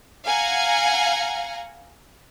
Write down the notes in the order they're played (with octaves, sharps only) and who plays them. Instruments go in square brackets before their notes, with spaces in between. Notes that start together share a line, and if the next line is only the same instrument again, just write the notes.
[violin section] F5 F#5 G#5 A#5